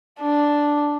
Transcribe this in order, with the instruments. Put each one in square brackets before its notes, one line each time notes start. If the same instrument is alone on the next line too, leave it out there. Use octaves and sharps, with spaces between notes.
[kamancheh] D4